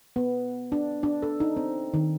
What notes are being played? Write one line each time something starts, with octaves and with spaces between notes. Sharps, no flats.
B3
D4
D4
A4
D#4
C4
D#3